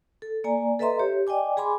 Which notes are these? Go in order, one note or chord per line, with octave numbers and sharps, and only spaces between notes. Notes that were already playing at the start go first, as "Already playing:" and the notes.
A4
A#3 D5 G#5 A#5
A4 B4 D#5 E5 A#5 C6
G4 C#5
D5 D#5 G5 G#5 D6
G#4 G#5 B5 C6 D6